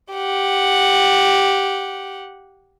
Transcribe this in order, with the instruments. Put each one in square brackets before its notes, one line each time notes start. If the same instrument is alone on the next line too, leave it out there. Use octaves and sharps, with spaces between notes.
[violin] G4 F#5